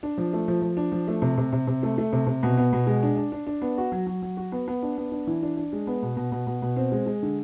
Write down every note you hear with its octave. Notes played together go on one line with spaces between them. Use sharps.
D4
F3
A3
F3
F3
D4
F3
A3
C3
C3
C3
C3
A3
A3
C3
C3
B2
B3
B2
G#3
D4
D4
D4
D4
B3
F#4
F#3
F#3
F#3
F#4
B3
B3
D4
B3
D4
E3
D4
D4
G#3
B3
B2
B2
B2
B2
B2
C4
G#3
G#3
D3